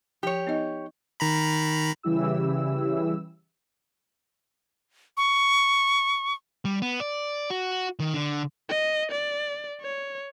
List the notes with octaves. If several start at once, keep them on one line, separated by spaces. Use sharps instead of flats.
F3 G4 C#5
B3 D#4 D#5
D#3 A#5 B5
C#3 E3 G3 E4 G4 E6
C#6
G3
B3
D5
F#4
D#3
D3
D#5
D5
C#5